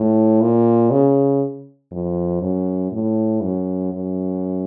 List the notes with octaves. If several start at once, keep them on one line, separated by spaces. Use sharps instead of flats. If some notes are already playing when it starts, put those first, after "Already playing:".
Already playing: A2
A#2
C#3
F2
F#2
A2
F#2
F#2